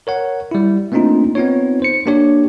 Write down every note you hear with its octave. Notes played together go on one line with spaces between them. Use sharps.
A#4 C#5 F#5
G3 E4
A3 A#3 C4 D4 D#4 F4
B3 C4 D#4 F4 C#5
C5 C#7
A#3 D4 G4 C#5